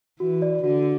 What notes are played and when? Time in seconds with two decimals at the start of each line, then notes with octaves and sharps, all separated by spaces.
0.20 E3 F#4
0.42 D5
0.63 D3 F#4